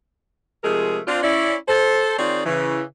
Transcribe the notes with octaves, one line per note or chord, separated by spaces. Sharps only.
C3 F3 G#3 A3 G#4 A#4
C4 D4 F4
C#4 E4 D5
A4 C5
D#3 C4 F4 G#4 C#5 D5
C#3 E3